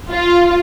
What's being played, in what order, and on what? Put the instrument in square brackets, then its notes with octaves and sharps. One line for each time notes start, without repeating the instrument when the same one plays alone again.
[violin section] F4